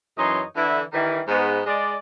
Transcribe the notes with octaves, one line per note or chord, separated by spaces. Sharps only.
F#2 E3 D#4 C#5 D#5 C6
D3 E3 E4
D#3 E3 G3
G#2 B3
G#3 D5